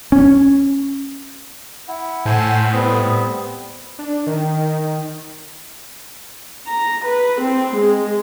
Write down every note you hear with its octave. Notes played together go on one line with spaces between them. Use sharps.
C#4
E4 F#5
A2 A4 C5 G#5
G3 B3 C4 D#6
D4
D#3
A#5
B4
C4
G#3